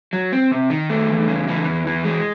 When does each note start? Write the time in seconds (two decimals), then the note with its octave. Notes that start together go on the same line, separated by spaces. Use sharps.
0.13 F#3
0.32 C4
0.52 C3
0.70 D#3
0.90 A3
1.09 E2
1.28 C#3
1.48 E3
1.67 E2
1.86 E3
2.05 G#3